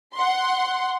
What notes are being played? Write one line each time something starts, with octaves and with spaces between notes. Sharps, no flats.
F#5 C6